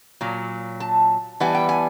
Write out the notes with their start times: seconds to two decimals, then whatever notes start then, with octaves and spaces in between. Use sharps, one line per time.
0.21 A#2 F#3
0.80 A5
1.40 E3 G3 B3 G#5
1.55 G5
1.69 G#5